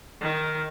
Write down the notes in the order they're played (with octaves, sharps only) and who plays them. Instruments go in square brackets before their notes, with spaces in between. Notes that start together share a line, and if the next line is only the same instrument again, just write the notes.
[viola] D#3